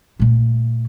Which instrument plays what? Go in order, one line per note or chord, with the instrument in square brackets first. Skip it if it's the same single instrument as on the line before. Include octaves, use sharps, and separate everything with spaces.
[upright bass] A#2 A3